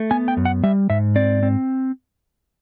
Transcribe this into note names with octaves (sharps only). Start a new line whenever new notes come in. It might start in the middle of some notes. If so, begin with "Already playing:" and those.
Already playing: A3
B3 G#5
G5
F#2
F#5
G3 E5
G#2 E5
C4 D5
C4